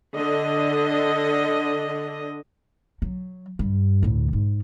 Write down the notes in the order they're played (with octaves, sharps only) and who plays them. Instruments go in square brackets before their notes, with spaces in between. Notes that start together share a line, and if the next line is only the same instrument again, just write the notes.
[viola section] D3 D#5
[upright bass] F#3
G2
D2 A2
G#2